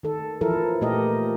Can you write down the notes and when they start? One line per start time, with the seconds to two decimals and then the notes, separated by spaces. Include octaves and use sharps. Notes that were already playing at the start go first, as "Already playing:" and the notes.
0.03 D#3 A4
0.41 E3 F3 E4 A4 A#4
0.81 A#2 A3 G4 A#4 D#5